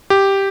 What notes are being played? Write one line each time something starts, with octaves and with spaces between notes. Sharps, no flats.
G4